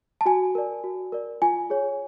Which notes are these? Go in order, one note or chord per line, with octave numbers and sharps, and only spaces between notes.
A5
F#4 G#5
A#4 D5
F#4
A#4 D5
F4 G#5
G#4 C#5